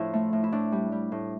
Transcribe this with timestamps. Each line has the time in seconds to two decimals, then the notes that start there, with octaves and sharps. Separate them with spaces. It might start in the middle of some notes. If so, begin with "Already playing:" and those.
Already playing: A2 F3 D4 E4
0.14 A3
0.33 A2
0.44 E4
0.52 A2 D4
0.72 G3
0.92 G3
1.12 A2